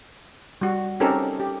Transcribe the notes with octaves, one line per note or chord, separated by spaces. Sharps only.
G3 F#4
C4 C#4 D#4 G4 A4 A#4
G4